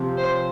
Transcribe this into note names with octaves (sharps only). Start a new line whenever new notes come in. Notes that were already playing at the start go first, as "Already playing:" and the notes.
Already playing: C3 F3 C4
C5